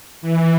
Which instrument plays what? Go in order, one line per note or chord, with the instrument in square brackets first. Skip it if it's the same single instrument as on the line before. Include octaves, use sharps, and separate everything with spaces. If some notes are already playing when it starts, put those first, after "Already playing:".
[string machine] E3